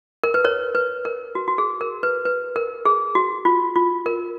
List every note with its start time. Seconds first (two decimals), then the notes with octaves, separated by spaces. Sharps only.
0.24 A#4
0.34 B4
0.45 A#4 C#5
0.75 B4
1.05 A#4
1.35 F#4
1.48 F#4
1.58 G#4
1.81 A#4
2.03 B4
2.25 B4
2.56 A#4
2.85 G#4
3.15 F#4
3.45 F4
3.76 F4
4.06 A#4